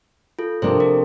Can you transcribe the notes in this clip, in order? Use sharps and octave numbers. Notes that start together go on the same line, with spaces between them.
F4 A4
C3 F3 A#3 D4 A4 C5
G4 A#4